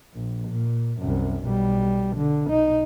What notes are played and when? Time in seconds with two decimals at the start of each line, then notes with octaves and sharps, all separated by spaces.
0.14 A#1
0.48 A#2
1.01 C2 F#2
1.44 B1 G3
2.17 D3
2.46 B1 D#4